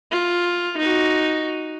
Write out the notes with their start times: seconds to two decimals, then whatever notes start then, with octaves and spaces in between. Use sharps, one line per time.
0.11 F4
0.78 D#4 F#4